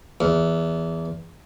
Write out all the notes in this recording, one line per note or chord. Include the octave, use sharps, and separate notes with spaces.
E2